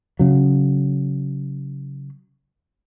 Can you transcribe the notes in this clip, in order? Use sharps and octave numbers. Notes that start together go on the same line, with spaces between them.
C#3 F#3